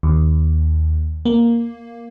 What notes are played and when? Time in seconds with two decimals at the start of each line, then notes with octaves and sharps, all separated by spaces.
0.03 D#2
1.25 A#3